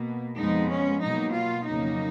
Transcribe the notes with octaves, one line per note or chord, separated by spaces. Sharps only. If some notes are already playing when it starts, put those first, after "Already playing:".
Already playing: B2 A#3
F2 F3 G#3 B3 D#4
C#4
B2 F#3 A#3 D#4
F4
F2 C#3 F#3 A#3 D#4